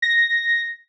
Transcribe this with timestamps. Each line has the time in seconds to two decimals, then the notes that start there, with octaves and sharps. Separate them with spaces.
0.02 A#6